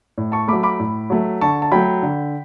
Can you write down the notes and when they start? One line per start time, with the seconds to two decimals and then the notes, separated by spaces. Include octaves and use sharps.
0.18 A2
0.32 A5 C#6
0.48 F#3 A3 B5 D6
0.63 B5 D6
0.80 A2
1.10 F#3 A3
1.41 D3 A5 C#6
1.62 A5
1.72 F#3 A3 G5 B5
2.03 D3